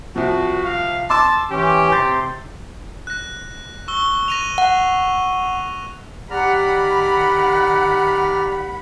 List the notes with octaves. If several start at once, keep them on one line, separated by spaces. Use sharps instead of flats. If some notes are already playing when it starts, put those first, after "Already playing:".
C2 F3 F#4
F5
A5 C6 D6 E6
E3 C#4 G4
C3 C6 G6 A6
F#6 A#6
C#6 E6 G7
A#6 D#7 F7
F#5
D#3 G4 D5 F#5 A#5 B5 F6